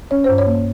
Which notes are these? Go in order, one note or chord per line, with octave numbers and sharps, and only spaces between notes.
C#4 C#5
G2 C5
C#5
A#3